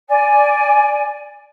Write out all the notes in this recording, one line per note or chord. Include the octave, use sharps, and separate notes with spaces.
D5 G#5